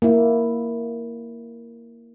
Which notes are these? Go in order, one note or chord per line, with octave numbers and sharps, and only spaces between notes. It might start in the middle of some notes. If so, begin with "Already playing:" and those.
A#3 E4